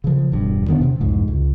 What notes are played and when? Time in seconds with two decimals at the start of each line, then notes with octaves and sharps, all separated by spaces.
0.04 C#3 F3
0.32 E1 G2
0.67 E1 D#3 B3 D4
0.81 C3
1.00 C2 F2 G#2
1.28 C#2